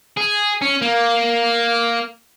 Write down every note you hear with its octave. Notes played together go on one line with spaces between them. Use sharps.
G#4
C#4
A#3